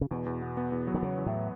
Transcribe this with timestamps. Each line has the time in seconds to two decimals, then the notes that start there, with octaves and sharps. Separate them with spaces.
0.01 C#3
0.11 E2 B2
0.26 E2
0.42 B3
0.57 B3
0.72 E2
0.87 F#3
0.94 D#3
1.03 E2 C#3
1.17 E2
1.26 A2